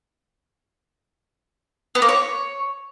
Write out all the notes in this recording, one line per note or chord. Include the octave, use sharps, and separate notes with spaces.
B3
A#3
C#5